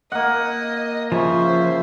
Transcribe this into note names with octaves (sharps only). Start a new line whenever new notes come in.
A#3 D#5 F#5
C#3 F3 C5 E5